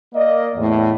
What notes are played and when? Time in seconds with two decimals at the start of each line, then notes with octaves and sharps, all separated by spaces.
0.14 A#3 D5 D#5
0.56 E2 A2